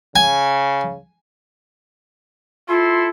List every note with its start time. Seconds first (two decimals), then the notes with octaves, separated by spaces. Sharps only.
0.16 C#3 G#5
2.68 E4 F4 A4 C6